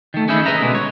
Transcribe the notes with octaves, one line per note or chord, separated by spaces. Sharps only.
D#3 A3
C#4 D#4 G#4 E5 B5
G#4 B4 D#5 E5 A#5
B2 D3 G#3
C#5